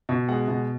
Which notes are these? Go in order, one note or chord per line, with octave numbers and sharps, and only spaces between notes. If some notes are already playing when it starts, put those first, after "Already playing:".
B2
G#3 F#5
B2